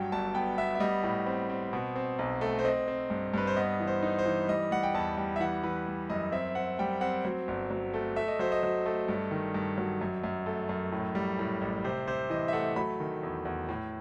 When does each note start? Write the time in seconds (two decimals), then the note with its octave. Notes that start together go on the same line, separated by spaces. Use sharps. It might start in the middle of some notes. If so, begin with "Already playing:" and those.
Already playing: G2 F#3 G5
0.12 G1 A5
0.35 B3 G5
0.58 B3 E5
0.75 E5
0.80 G3 D#5
1.03 A2
1.26 C4
1.50 C4
1.73 B2
1.96 C4
2.19 B1
2.41 A3
2.59 C5
2.65 C4 D#5
2.88 C4
3.10 G2
3.34 G2 B4
3.47 C5
3.56 B3 D#5
3.80 E3
3.87 C5
4.03 D#4
4.19 C5
4.26 E3
4.48 G3 D#5
4.71 G3 F#5
4.83 G5
4.94 E2 A5
5.17 G3 G5
5.36 E5
5.40 E3 F#5
5.63 E3 B4
5.87 G3
6.10 F#2 D#5
6.32 C4 E5
6.55 C4 F#5
6.79 G3 G5
7.01 C4 F#5
7.25 F#3
7.48 G1
7.71 F#3
7.94 A3
8.16 A3 E5
8.28 D#5
8.39 F#3 C5
8.52 D#5
8.63 F#3
8.86 A3
9.08 G2
9.31 D#3
9.54 G2
9.78 F#3
10.01 F#2
10.24 F#2
10.46 A3
10.69 F#2
10.92 A2
11.15 G3
11.39 A2
11.61 A1
11.84 C3 C5
12.07 C3 C5
12.30 E3 D#5
12.48 E5
12.53 A3 F#5
12.76 F#3 B5
13.00 D#3
13.23 E2
13.45 E2
13.69 A2